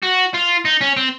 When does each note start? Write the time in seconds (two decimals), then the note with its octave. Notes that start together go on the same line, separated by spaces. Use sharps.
0.03 F#4
0.34 F4
0.65 D#4
0.81 C#4
0.97 C4